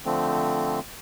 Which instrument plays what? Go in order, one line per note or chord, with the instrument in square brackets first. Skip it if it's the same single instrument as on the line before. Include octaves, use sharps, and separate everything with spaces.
[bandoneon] D3 F3 A3 C4